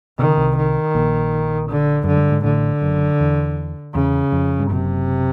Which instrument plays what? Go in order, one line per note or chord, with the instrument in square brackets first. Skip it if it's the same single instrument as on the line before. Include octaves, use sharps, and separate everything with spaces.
[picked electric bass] C3 [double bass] D#3
[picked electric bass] C#3
C2 C3
[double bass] D#3
[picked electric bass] A#1 A#2
[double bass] D3
[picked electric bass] F#2 [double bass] D3
[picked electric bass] G2
G#2
[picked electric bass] A1 A2 [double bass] D3
[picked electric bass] F#1 F#2
E2
[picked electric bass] E2 [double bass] C#3
[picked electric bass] F2
G2
[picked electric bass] F#1 F#2 [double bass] C3